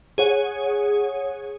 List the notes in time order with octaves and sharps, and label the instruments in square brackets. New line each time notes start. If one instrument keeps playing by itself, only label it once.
[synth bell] G#4 C#5 F#5